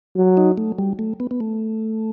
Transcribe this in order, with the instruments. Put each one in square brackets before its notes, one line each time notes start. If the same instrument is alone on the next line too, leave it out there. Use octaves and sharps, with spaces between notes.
[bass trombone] F#3
[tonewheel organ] D#4
A3
G3
A3
B3
B3
A3